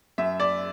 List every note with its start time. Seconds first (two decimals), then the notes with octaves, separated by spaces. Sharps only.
0.18 F#2 E5
0.40 D5